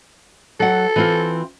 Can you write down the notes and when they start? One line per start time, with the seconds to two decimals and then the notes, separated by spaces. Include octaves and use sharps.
0.60 F#3 A4 F#5
0.96 E3 C4 F4